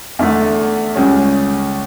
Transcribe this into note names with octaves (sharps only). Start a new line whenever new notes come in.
E2 D3 A3
C#2 C#3 G3 C#4